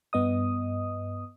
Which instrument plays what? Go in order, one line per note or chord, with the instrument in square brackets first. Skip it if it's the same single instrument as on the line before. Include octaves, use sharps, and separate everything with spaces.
[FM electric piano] G2 B3 D#5 D#6